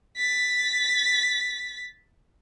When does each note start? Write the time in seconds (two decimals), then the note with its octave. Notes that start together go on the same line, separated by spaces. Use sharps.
0.17 A6 B6